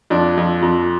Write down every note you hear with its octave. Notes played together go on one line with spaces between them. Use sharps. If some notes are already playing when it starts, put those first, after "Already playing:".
F2 D4
F2
F2